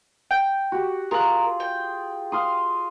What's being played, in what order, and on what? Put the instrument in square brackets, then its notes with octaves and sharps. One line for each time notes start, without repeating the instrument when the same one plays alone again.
[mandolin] G5
[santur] F#4 G4
[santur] F4 G#4 [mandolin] A#4 F#6
[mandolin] G5
[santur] F5 C6 D#6